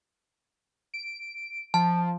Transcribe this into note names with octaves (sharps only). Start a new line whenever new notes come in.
D7
F3 A5